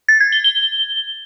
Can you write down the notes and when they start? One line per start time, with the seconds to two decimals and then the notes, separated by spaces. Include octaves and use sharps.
0.08 A6
0.20 G#6
0.32 G7
0.44 G7